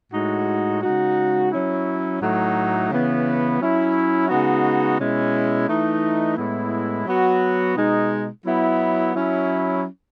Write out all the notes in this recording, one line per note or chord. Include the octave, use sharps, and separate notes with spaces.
A2 G#3 D#4 F#4
C#3 G#3 D#4 F#4
F#3 C#4 E4
A2 F#3 A3 D#4 F#4
C#3 E3 B3
F#3 C#4 E4
C#3 G#3 B3 D#4 F#4
B2 G#3 C#4 E4
E3 A3 D#4
A2 G#3 B3 E4
F#3 B3 F#4
B2 G#3 D#4
F#3 B3 E4
F#3 C#4 E4